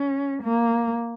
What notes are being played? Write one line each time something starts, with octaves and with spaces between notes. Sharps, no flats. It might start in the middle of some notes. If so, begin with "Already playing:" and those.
Already playing: C#4
A#3